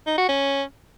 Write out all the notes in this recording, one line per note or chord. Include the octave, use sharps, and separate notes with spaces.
D#4
F#4
C#4